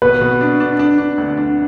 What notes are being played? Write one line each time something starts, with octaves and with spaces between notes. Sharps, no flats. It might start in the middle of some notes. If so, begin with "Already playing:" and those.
B2 B4
B2
D4
D4
D4
D4
D2
D4